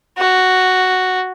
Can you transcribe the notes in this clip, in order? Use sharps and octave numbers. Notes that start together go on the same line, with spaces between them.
F#4